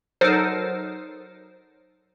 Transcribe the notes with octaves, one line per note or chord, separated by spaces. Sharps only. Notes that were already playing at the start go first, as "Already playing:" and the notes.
F#3 D#4 A4 A#4 C5